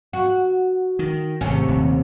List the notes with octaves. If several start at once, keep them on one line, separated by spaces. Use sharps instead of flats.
F#4
D#3
G#1 C3 A3 C#4
D#1 D#2